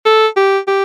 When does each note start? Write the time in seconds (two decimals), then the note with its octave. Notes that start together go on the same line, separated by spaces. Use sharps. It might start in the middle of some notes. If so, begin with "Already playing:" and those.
0.06 A4
0.37 G4
0.68 G4